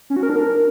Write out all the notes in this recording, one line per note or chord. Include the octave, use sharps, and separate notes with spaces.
C#4
F#4
A#4
D4
A#4